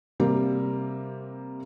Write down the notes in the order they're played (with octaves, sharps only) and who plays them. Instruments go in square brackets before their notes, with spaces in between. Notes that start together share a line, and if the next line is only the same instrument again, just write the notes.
[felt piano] C3 G3 A#3